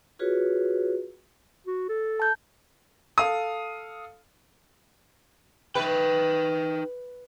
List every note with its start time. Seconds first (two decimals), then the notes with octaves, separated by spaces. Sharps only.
0.19 F4 F#4 G#4 B4 C#5
1.67 F#4
1.89 A4
2.20 A5 G6
3.18 A4 F5 D#6
5.75 D#4 B4 E5 G5